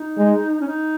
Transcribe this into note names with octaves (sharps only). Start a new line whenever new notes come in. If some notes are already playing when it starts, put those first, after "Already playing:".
Already playing: D#4
G#3
C#4
D#4